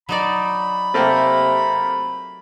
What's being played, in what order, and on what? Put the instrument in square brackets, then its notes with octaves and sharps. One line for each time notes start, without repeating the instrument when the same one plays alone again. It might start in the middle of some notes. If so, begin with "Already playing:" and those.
[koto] F#3 D#4 D5 [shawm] B5
[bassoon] C3 [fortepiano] A3 A#3 G4